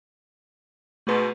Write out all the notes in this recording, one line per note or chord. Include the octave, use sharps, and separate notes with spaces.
G#2 B2 A3 B4